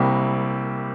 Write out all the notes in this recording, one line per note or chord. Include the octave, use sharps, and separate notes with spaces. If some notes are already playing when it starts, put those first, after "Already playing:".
Already playing: C2 C3 G3 A#3